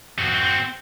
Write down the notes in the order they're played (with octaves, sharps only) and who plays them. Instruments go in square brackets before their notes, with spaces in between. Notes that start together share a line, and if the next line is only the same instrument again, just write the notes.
[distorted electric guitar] C4 F#4